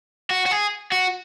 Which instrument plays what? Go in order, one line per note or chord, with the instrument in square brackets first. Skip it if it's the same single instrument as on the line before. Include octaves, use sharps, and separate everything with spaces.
[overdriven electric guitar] F#4
F#4
G#4
F#4